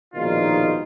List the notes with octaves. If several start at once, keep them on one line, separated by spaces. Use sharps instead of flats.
A#1 B2 D#3 G#3 D#4 F4